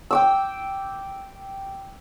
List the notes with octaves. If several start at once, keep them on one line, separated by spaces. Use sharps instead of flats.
G5 D6 E6